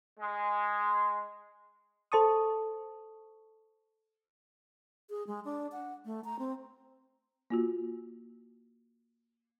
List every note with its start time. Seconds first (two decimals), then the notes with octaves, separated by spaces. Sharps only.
0.20 G#3
2.12 A4 C5 A5 C#6 D#6
5.10 G#4
5.27 G#3
5.45 D4
5.72 F#5
6.05 A3
6.25 A#5
6.39 C4
7.50 A#3 F4 F#4